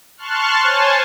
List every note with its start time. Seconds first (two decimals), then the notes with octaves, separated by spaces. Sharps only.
0.17 A5 C6 C#6 F6 F#6
0.62 C5 C#5 G#5 A5